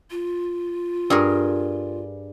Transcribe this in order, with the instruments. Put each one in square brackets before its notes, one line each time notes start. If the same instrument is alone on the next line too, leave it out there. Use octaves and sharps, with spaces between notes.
[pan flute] F4
[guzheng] G2 G#4 A#4